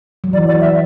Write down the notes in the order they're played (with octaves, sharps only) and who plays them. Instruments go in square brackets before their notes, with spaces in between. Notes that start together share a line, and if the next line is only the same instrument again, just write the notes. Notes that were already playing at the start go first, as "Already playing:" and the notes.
[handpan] F#3
[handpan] E3 [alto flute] D5
[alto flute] D5
E5